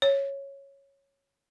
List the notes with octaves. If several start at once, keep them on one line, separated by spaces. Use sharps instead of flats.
C#5